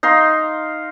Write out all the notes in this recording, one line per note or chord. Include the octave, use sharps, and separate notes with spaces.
D#4 F5 C6